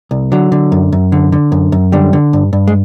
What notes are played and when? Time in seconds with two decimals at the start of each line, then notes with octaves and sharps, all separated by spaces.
0.11 C2
0.32 D3 F#3
0.52 D3
0.72 F#2
0.92 F#2
1.12 D3
1.32 D3
1.52 F#2
1.72 F#2
1.92 D3 G3
2.13 D3
2.33 G2
2.53 G2
2.67 G#3